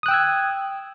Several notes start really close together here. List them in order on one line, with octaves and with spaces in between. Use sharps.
D#6 F#6 G5 E6 G#6